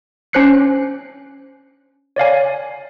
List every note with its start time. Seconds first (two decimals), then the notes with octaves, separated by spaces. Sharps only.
0.33 C#4 D4 C5 F#6 C7 C#7
2.16 C#5 D5 F5 G#5